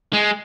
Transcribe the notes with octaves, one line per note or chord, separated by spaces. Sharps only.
G#3